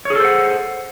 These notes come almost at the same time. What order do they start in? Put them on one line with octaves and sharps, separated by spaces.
C#5 G#4 A4 C5 F#5